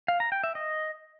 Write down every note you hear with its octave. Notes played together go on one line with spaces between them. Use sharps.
F5
A#5
G5
E5
D#5